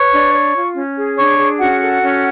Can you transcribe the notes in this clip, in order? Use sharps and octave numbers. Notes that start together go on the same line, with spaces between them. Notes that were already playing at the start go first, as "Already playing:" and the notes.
Already playing: B4 C#5 C#6
D4
C#5
F4
C#4
G#4
D4 C#5 C#6
G#4
C#4 F#4 F#5
A4
C#4